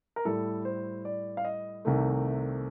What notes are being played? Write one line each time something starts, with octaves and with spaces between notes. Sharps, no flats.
A#4
A2 G3 A4
C5
D5
F5
D#5
C2 C3 D#3 A3